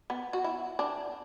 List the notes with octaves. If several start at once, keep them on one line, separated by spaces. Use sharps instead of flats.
B3
F#4
E4
D4